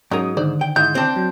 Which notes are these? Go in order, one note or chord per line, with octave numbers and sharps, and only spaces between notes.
G#2 F#3 C#4 A#4 D#6
D3 D#3 C5 D5
G5
G#2 E4 G6
C4 D4
F#3